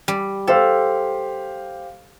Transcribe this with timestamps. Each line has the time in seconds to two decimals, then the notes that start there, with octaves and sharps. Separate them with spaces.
0.08 G3
0.48 G4 A4 C5 F5